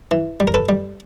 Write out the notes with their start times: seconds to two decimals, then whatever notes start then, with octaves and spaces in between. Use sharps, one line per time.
0.11 E3
0.40 G3
0.47 A#4
0.54 A4 B4
0.69 G3